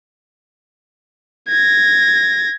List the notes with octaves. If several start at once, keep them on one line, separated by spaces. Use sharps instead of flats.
G#6 A#6